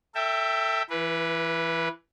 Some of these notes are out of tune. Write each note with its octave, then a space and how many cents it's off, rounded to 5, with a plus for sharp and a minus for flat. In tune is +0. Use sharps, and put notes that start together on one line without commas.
A4 +30 E5 +0 G5 +5
E3 +20 B4 -15